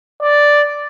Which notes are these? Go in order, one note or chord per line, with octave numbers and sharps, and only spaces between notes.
D5